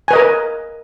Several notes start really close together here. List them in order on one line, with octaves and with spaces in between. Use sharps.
G#5 B4 D#5 A#4